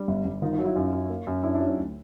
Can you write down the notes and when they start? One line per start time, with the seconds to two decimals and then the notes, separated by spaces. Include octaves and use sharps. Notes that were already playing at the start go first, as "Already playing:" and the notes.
Already playing: G3 D4
0.08 G1
0.25 G1
0.42 D#3 D#4 F4
0.53 D#4 F4
0.59 F#3
0.64 E4 F#4
0.75 F#2 D#4 F4
0.92 F#2
1.09 A#3
1.27 F#2
1.43 F#2 D4 E4
1.54 D4 E4
1.61 F#3
1.66 C#4 D#4
1.77 D2